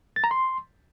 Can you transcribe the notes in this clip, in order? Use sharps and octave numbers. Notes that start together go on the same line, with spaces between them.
A6
A#5
C6